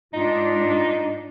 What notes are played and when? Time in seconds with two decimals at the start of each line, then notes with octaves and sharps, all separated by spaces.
0.14 G#2 D4 D#4 F4